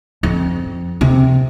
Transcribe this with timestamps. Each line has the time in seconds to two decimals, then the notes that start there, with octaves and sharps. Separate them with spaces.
0.23 F2
1.01 C3